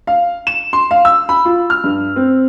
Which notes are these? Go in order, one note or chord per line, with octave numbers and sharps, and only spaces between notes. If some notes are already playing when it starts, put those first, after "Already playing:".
F5
E7
C6
F5
E6
B5
F4
F6
G2
C4